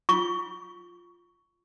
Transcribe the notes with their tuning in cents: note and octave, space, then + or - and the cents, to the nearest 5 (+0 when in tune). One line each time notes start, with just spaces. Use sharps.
F4 +0 C#6 +10